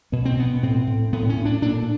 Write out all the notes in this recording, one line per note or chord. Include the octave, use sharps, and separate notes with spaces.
B2 B3
C4
B2 B3
A2 C4
A2
A2 B3
C#4
A2
D4
A#2 D4